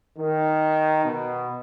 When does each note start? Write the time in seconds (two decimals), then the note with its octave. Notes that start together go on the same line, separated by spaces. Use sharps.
0.17 D#3
1.04 B2